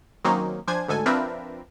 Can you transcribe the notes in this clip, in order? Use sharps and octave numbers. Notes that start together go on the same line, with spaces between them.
D#3 F#3 A#3 C4 C#4 D#4
F3 D4 C5 G#5 G#6
D2 G#2 A4 G#5
F3 C4 D4 A#4 B4 E5